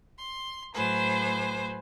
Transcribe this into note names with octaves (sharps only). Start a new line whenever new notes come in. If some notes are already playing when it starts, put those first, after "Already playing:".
C6
A2 F#3 B4 C5 G#5